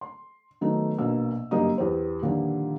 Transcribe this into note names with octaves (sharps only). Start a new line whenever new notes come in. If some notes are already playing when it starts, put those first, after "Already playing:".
C6
D#3 F#3 A3 B3 D#4
A#1 B2 A#3 E6
G1 F#2 G3 A#3 D#4 D#6
E2 G4 C5
A#2 D3 D#3 F3 G3